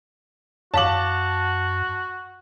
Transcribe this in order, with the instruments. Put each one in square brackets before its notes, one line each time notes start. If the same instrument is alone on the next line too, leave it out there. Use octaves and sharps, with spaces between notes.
[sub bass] F#2 [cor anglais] F#4 [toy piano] C#5 F5 D6 [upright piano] A5 F#7